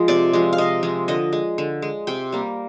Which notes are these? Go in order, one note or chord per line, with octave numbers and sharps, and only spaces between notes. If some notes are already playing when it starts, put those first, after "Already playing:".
Already playing: F3 G#3 F4 G#4
C3 D5
F3 G#3
F5
C3 D#5
F3 G#3
D3 D#5
G#3
D3
G#3
C3 G5
G3 A#3